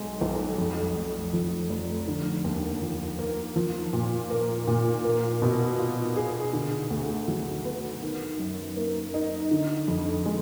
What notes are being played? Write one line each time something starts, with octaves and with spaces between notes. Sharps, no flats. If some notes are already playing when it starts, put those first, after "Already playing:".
Already playing: B1 G#3
B1
F2
F1
F3
F1
D3
D#2
F3
A#3
F3
A#2
A#3
A#2
A#3
B2
F4
G#4
D3
D2
F#3
B3
D#3
F#2
A#3
D#4
D3
F2
G#3